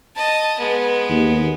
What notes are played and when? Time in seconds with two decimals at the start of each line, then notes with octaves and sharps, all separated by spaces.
0.16 D#5 A5
0.59 G#3 B3
1.10 D#2